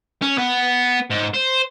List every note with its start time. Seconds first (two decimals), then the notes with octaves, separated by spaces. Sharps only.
0.22 C#4
0.38 B3
1.10 G#2
1.34 C5